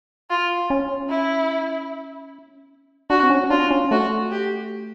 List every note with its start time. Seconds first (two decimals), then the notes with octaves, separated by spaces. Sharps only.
0.30 F4
0.70 C#4
1.09 E4
3.10 D4 F#4
3.23 C4
3.30 C#4
3.50 D4 F4
3.71 C#4
3.91 A3 F#4
4.31 G4